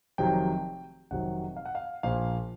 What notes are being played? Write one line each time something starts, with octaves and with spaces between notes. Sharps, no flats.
F1 F2 C3 D#3 F#3 G5
F1 F2 C3 D#3 F#3 F#5
F5
F#5
F5
A#1 A#2 F3 F5